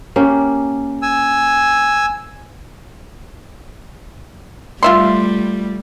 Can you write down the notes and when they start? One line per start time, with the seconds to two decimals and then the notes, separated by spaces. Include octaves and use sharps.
0.16 A#3 C#4 G4
1.02 G#5 E6
4.83 G3 A3 F4 E5 C6